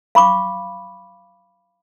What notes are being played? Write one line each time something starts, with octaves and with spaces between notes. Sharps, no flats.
F5 B5 C#6 D6